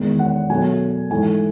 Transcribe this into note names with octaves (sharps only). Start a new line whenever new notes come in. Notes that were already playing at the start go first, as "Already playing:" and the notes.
Already playing: E2 D#3 G#3
F#5
B2 F#3 A3 G#5
G#2 E3 A3 G#5